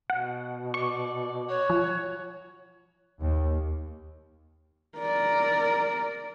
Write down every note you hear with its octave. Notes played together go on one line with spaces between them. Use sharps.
B2 F#5
D5 C#6
F#4 C#5
F3
D#2
A#4 D5